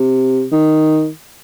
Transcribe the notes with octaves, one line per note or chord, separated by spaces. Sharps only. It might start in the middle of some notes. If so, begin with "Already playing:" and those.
Already playing: C3
D#3